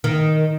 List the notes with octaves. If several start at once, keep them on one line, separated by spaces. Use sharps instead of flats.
D#3